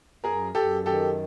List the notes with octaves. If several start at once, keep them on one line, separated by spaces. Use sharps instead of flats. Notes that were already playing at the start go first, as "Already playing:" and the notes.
F#2 G#4 A#4
F#2 G4 A4
D#3 G4 A4